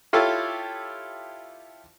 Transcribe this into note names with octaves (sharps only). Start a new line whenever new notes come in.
E4 F4 G4 A4 C#5